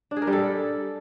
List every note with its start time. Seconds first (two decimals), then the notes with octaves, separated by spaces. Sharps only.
0.11 D4
0.16 G#4
0.22 A#4
0.27 G3
0.33 A4